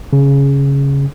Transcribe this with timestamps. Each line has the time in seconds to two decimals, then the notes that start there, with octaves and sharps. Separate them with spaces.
0.13 C#3